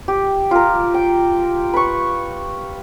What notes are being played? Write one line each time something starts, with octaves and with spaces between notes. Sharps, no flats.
G4
F4 A#4
G5
B4 C#6